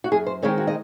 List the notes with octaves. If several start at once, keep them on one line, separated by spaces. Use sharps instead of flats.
F#4
F#2 G#4
C5
D#3 G#3 C4 C#5
F#4
D#5